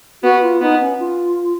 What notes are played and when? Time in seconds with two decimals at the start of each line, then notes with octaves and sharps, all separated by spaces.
0.23 B3 F#4
0.42 F4
0.61 B3 D#4
0.80 C#4
0.99 F4